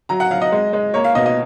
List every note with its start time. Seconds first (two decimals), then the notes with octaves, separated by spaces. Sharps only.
0.09 F#3 A#5
0.20 F#5
0.31 F#3 F5
0.41 D#5
0.52 G#3
0.73 G#3
0.94 A#3 C#5
1.04 F5
1.15 B2 D#5
1.26 D#5